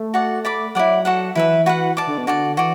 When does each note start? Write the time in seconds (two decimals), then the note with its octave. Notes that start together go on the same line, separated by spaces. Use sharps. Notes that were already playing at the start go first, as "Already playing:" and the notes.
Already playing: A3
0.14 F#4 D5 F#5
0.45 D5 B5 D6
0.75 F#3 E4 A4 D5 F#5
1.05 F#4 A4 F#5
1.35 E3 E4 B4 E5
1.66 F#4 B4 F#5
1.97 D5 A5 D6
2.07 D3
2.18 B2
2.27 D3 F#4 D5 A5
2.57 E3 F#4 D5